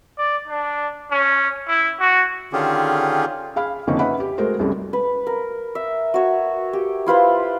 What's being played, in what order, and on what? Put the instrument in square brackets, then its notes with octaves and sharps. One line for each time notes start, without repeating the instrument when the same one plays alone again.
[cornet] D5
D4
C#4
E4
F#4
[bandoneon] D3 D#3 C#4 F4 G4 G#4
[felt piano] G#4 F5 B5 F6
F2 D3 A#3 C#4 D#4 C#6
C#4 B4 D#5 E5 F#5 B5
G4
G#3 A3 F#4 A#4 C5
C2 F#2 G3 G#3 A4
[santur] B4
A#4
E5
F#4 C#5
G4
E4 F4 B4 C5